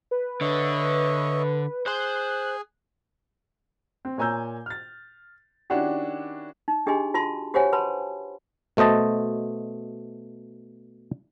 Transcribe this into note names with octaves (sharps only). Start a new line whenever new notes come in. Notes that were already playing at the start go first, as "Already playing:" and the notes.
B4
D3 C#5 D#5 E5
G#4 C5 C6 F#6
C4
A#2 C#5 G#5 A#5 E6 G6
F6 A6
D#3 C#4 D4 E4 F#4 G4
D#4
D4 G4 G#4 D#5 G#5 C6
F4 F#4 A5 C6
F#4 G4 C5 C#5 F#5 G#5
B4 F#5 A5 B5 C6
B2 A3 C5 D#5 A5